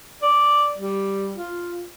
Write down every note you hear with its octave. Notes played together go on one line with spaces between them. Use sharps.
D5
G3
F4